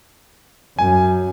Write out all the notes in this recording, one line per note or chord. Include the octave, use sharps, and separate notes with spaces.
F#2 G#5